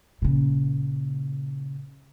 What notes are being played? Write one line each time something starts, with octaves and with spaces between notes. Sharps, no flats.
A#2 C#3